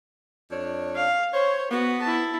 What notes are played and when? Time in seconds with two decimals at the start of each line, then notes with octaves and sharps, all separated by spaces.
0.51 F2 D4 C#5
0.96 F5
1.34 C5 C#5
1.71 B3 F#4
2.02 E4 A5